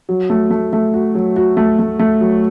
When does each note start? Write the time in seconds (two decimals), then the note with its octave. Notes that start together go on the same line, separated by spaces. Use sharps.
0.09 F#3
0.30 A3
0.50 A3
0.73 A3
0.94 F#4
1.15 F#3
1.36 F#4
1.57 A3
1.79 A3
1.99 A3
2.21 F#3